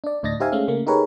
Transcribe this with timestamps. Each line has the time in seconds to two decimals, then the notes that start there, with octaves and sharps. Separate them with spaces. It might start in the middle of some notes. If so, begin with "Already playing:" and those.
0.04 D4 D5
0.23 D2 A2 D4 D#5 A6 A#6
0.40 D#4 G4 C5 E5 F5 G#5
0.52 G#3 A3 C#4 F5
0.68 C#3 A3 A#3
0.87 D#4 G4 G#4 A#4 B4 C#5